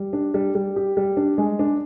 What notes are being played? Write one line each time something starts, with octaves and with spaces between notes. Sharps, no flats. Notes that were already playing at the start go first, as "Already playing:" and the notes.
Already playing: G3
D4
G3
G3
G4
G3
D4
G#3
D4